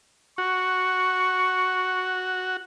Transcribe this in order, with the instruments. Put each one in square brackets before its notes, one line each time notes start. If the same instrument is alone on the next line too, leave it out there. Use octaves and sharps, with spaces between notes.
[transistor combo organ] F#4 [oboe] C#6